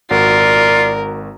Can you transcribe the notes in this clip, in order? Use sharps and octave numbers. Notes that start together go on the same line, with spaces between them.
G#1 F4 F#4 A#4 D5